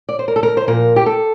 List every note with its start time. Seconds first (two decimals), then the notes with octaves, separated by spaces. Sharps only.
0.09 D5
0.19 C5
0.28 A#4
0.36 A4
0.43 A#4
0.57 C5
0.67 A#2 F3 A#4
0.96 G4
1.06 A4